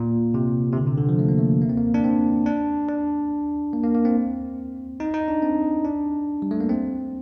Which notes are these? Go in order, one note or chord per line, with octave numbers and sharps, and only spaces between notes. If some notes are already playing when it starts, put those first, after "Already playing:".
Already playing: A#2
C3
C3
D3
C3
D3
F3
A3
A#3
A3
A#3
C4
A#3
D4
C4
D4
D4
A#3
A#3
A#3
C4
D#4
D#4
D4
C4
D4
G3
A3
A#3
C4